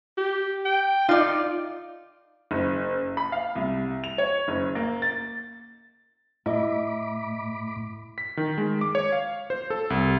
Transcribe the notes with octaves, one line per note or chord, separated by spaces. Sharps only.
G4
G5
D#4 F4 D5
F#1
B5
F5
C2
F7
C#5
F#1
A#3
A6
A2 E4 D#5 B5 D6
B6
D#3
G#3
D6
C#5
F5
C5
A4
C2